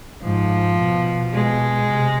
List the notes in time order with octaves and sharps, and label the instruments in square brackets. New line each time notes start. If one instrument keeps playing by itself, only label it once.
[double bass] G#2 [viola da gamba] F3
[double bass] B2
[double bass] B2 [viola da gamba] G#3
[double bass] C3